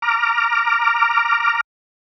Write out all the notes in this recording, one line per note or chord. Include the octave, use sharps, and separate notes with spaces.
A#5 D6 F6